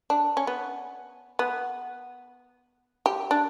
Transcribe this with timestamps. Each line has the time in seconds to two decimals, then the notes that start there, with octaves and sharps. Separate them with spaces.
0.10 D4
0.37 C#4
0.47 B3
1.39 B3
3.06 G4
3.31 D4